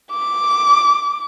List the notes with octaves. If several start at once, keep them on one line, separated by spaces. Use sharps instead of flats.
D6